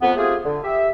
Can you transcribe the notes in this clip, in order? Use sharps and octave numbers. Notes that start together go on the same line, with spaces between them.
F2 B3
A3 C4 F4 G4 G#4
D3
G4 E5